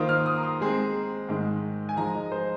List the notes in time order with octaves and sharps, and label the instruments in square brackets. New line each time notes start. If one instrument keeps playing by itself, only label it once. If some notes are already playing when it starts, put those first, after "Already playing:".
Already playing: [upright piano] D#3 A#3 F4 C5 [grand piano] D#6
[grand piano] F6
D#6
A#5
C6
[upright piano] G#3 C4 G#4 C5
G#2 D#3 G#3
[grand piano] G#5
[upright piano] F3 G#3 D#4 [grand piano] A#5
[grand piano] D#5
C5